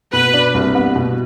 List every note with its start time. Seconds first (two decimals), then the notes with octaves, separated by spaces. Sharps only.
0.13 B2 B4
0.34 D4
0.54 C2
0.75 B3
0.96 B2